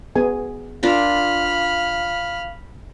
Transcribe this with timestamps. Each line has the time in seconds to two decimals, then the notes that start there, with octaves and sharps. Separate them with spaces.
0.16 B3 G#4 G#5
0.83 D4 F4 A#4 F5 B5 F6